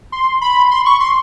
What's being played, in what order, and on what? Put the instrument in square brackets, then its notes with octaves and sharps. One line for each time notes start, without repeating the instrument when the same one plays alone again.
[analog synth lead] C6
B5
C6
C#6
C6